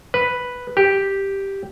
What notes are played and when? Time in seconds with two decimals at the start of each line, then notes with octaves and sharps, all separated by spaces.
0.14 B4
0.77 G4